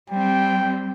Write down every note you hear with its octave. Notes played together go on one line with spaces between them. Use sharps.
G3 C4 G5